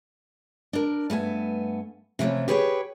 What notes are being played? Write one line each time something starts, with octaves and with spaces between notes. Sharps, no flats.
D4 A#4
G2 A3 B3 G#5
C3 E3 F3 G#3 A3 C#4
G4 G#4 B4 C#5 F5 G5